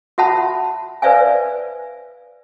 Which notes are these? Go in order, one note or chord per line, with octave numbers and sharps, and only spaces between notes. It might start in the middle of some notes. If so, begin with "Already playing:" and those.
F#4 E5 F#5 A5 B5
B4 C5 D5 E5 F5 G#5